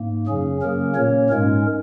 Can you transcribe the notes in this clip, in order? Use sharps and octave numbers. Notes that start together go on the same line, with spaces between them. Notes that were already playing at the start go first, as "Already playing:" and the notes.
Already playing: G#2 A#3
F#2 C#3 F#3 C#4 G#4
C#3 F#3 A#3 C#4 A#4
A#2 A#3 C#4 C#5
G#2 G#3 C#4 A#4